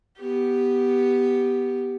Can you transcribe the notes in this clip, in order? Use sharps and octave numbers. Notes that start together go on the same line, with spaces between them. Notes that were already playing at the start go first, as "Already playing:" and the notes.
B3 G4